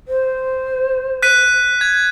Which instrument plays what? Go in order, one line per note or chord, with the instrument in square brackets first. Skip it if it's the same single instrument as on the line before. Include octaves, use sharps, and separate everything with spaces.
[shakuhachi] C5
[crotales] F#6 B6 D#7
G#6